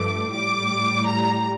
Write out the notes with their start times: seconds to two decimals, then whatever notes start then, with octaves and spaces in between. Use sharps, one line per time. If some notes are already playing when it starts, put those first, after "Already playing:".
Already playing: G2 F3 A3 D6
0.32 A2 G3 D6
1.06 A#5